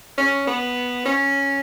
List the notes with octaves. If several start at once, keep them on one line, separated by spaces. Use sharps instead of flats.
C#4
B3
C#4